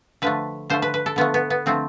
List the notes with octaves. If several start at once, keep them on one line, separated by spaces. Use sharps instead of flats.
D3 F3 A3 B4
D3 F3 A3 C5
B4
B4
A4
D3 F3 A3 B3
B3
B3
D3 F3 A3 C4